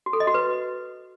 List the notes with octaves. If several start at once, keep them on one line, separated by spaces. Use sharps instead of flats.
F#4
A4
D#5
F#4
B4